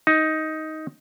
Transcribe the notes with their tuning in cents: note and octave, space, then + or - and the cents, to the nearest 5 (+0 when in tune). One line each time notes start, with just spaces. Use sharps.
D#4 +10